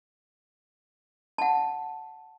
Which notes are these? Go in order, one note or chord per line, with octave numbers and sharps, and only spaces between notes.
F#5 A5